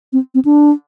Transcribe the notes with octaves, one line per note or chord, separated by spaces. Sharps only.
C4
C4
D4